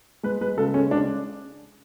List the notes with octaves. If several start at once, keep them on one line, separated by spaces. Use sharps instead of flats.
G#3 B4
G#3 B4
C#3 A4
G#3 C#4
C#3 D4